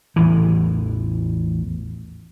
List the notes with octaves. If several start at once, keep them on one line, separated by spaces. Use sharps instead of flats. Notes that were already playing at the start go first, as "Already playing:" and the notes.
A1 E2 E3